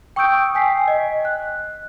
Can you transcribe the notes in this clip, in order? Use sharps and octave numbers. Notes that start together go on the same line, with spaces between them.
G5 C#6 D#6 E6 G6 D7
G5 G#5 B6 C7
D#5
F#6